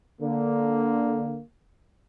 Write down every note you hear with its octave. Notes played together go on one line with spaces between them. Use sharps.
D3 A#3